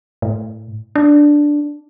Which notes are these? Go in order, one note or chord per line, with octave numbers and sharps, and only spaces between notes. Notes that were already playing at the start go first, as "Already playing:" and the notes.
A2
D4